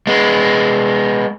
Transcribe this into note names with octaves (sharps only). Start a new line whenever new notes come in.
G#3 B3